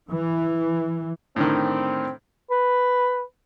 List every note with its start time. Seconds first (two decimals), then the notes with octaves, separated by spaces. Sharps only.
0.10 E3
1.36 A2 D3 D#3 C4
2.51 B4